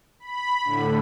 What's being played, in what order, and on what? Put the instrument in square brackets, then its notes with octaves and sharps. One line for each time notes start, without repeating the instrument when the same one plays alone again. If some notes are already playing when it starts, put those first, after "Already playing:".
[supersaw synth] B5
A2 D3